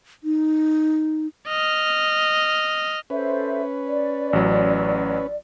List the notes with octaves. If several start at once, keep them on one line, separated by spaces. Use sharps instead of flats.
D#4
D#5 F6
C#4 A4 B4 C5 E5
D5
A1 F#3